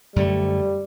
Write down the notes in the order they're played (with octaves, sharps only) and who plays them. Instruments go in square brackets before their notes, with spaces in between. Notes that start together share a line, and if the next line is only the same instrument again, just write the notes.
[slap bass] F#2 D3 A3 [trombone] G3